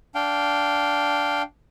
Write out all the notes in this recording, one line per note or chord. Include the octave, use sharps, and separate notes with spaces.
D4 F5 G5